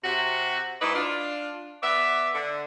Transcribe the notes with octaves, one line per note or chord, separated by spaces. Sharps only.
C3 F#4
G#2 D#4 E4 B4 D5
D4 F4
B3 D5 E5
D3